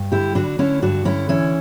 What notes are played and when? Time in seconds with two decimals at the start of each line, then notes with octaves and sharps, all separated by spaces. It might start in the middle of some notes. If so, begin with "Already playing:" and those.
Already playing: G2
0.12 D3 E4 G4
0.35 D3 D4 F#4
0.59 D3 C#4 E4
0.82 G2 D4 F#4
1.05 D3 C#4 E4
1.29 E3 C#4 E4